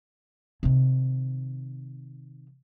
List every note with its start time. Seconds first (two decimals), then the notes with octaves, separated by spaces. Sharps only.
0.63 C3 D#3